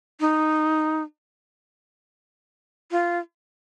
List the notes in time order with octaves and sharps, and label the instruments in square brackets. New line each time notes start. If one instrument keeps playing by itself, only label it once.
[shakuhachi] D#4
F4